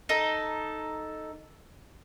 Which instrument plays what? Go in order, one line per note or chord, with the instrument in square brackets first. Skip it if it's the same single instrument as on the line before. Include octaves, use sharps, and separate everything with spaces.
[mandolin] D#4 A4